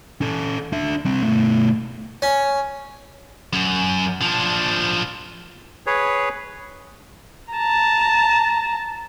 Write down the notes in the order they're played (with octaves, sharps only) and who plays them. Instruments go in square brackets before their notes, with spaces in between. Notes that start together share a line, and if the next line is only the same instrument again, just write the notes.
[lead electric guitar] C#4 A4
D4 E5
G3 C4
B2 A3
[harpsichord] C#4
[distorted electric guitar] F#2
F3 D4
[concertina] G#4 B4 C#5
[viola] A5 A#5